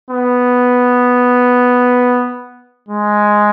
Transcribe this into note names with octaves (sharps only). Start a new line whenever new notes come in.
B3
G#3